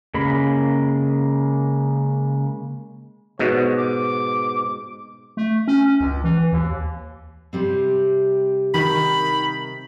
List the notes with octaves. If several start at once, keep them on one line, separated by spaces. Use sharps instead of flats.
C#3 G#3 A#3 B5
G#2 B2 C#5
D6
A3
C#4
C#2
E3
D#2
C3 G3 C4
D#3 B5